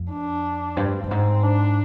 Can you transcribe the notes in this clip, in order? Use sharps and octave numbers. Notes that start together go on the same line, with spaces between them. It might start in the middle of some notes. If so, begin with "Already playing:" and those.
Already playing: F2
D4
G2 C4
G2
G#2 C4
D4